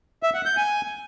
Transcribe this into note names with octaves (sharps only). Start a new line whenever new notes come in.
E5
F#5
G6
G#5